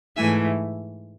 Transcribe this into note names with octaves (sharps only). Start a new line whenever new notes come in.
G#2 E3 A3 E5 G#5